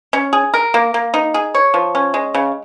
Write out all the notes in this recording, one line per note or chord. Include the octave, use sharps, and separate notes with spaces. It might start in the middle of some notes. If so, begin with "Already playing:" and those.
C#4
G#4
A#4
A#3
A#3
D#4
G#4
C#5
F3
C#4
G#3
C#3